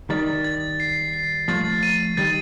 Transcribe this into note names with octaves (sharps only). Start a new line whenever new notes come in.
D#3 G3 A6
A6
C7
C7
F3 A3 A6
D#7
D#3 G3 A6